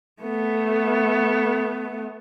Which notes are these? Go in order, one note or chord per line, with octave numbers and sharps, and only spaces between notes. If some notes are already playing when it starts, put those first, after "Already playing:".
A3 B3